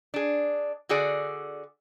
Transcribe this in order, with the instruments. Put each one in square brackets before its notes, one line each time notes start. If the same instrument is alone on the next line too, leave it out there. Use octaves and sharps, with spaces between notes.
[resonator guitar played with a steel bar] D4 G#4
D3 F#4 G#4 D5